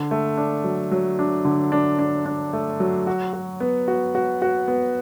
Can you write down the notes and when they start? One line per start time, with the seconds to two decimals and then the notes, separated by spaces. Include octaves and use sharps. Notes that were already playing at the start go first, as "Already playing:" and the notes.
Already playing: D3
0.11 A3
0.37 D4
0.64 F#3
0.91 F#3
1.19 D4
1.45 D3
1.72 D4
1.99 D4
2.26 D4
2.53 A3
2.80 F#3
3.07 F#4
3.33 F#4
3.60 B3
3.88 F#4
4.15 F#4
4.42 F#4
4.68 B3